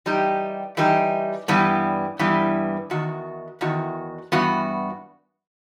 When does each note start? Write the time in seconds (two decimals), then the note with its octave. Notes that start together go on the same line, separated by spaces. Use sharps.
0.06 E3 G3 D#4 G4
0.77 E3 G3 D#4 G4
1.48 G2 E3 G3 B3
2.19 G2 E3 G3 B3
2.90 E2 D#3 F#4
3.61 E2 D#3 F#4
4.32 G2 E3 B3 F#4